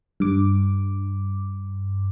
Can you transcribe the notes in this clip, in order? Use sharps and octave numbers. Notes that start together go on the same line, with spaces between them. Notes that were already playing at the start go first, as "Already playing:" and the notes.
G2 D6